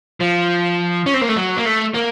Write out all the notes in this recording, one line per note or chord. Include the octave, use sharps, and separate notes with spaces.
F3
C#4
C4
A#3
A3
F#3
A#3
A3
A#3